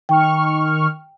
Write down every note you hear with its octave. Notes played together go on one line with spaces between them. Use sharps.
D#3 G5 C#6 F6